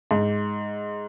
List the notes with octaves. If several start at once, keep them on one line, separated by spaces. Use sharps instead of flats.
G#2